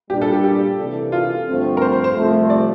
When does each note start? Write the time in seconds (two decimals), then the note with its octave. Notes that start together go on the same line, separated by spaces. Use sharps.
0.10 A#2 G3 D4 G4
0.22 A4
0.33 G4
0.44 G4
0.79 C3 E3 A#3 D4 A4
1.12 F4
1.48 G2 D3 F3 A3 C4
1.77 A#4
1.82 C5
1.93 C5
2.04 C5
2.15 C2 C3 F3 A3
2.50 D5